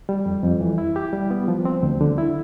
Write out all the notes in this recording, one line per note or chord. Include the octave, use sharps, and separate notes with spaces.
G3
F2
F2
E3
E4
G4
G3
B3
F3
C4
D2
D3
E4